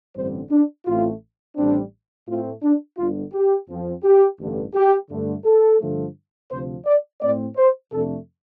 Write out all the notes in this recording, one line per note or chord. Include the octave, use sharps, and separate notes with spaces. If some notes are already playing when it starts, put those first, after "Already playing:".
A1 G2 D3 G3 C4 C5
D4
A1 A2 A3 C4 F4
A1 A2 G3 C4 D4
A2 A3 C4 F4
D4
G1 G2 D3 F4
G4
F2 F3 C4
G4
A1 G2 D3
G4
G2 D3 A3
A4
G2 D3 F3 A3
D2 C3 F3 C5
D5
A2 A3 C4 D5
C5
F2 C3 A3 D4 A4